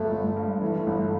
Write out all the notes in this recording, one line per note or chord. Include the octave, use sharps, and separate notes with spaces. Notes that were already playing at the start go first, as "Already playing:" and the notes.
Already playing: G1 F3 A3
G1
G2
E3 A3
G1